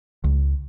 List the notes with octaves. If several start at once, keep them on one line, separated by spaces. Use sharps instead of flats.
C#2